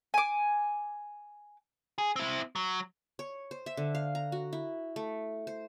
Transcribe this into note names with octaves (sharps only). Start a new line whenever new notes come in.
G#5 D6
G#4
C4 E4
F#3
C#5
C5
E5
D3
F5
A#5
F#4
E4
A3
C5